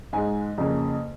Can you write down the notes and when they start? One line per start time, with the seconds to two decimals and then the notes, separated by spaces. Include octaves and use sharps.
0.13 G#2 G#3 G#5
0.58 F2 C#3 A#3